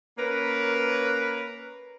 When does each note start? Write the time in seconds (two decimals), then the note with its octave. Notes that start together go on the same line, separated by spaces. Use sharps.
0.18 A#3 C#4 A#4 B4